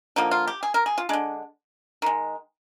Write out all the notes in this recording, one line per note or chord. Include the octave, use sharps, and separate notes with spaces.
D3 F3 A#3 D#4
F4
G4
G#4
A#4
G#4
F4
D3 G#3 D4
D#3 G#3